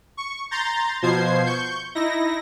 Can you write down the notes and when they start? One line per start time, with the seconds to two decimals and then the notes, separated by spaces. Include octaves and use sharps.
0.17 C#6
0.51 A#5 C6 G6 A6
1.02 B2 F3 C5 G#6 C7
1.46 C#6 G6
1.95 D#4 E4 A#6